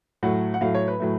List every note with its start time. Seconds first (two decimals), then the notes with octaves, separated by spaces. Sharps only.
0.23 A2 F#3 A3 F#5
0.54 F#5
0.61 A2 F#3 A3 F5
0.74 C#5
0.88 B4
1.00 A2 F#3 A3